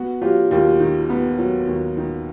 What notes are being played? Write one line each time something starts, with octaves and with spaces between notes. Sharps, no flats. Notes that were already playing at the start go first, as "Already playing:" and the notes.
Already playing: B3 F#4
F#3 F4 G4
D#2 F4 G4
D#3
B3
F#3
D#2
D#3